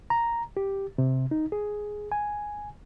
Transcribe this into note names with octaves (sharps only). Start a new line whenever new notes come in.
A#5
G4
C3
D#4
G#4
G#5